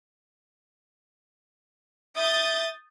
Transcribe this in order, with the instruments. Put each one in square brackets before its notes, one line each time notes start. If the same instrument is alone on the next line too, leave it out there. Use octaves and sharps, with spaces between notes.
[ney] E5 [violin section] D#6 G6 A6